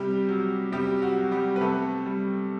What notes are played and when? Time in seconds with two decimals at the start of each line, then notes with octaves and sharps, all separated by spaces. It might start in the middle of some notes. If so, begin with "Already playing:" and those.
Already playing: C3 G3 G4
0.29 F#3
0.72 C3 G3 G4
1.02 F#4
1.17 F#3
1.32 G3 G4
1.56 B4
1.61 C3 A3 A4
2.06 G3